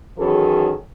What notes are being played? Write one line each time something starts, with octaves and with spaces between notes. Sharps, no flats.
D#3 E3 F#3 C#4 G#4 A4